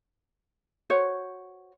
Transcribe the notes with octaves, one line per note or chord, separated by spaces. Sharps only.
F#4 C5 C#5